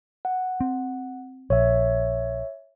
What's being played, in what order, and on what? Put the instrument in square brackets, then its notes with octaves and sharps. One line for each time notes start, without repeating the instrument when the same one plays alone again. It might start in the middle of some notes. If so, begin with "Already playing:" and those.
[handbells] F#5
[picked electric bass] C4
[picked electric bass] A#1 [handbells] C#5 E5